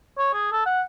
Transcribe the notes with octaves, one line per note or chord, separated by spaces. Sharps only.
C#5
G#4
A4
F#5